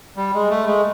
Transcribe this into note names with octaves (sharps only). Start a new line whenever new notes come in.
G3
G#3
A3
G#3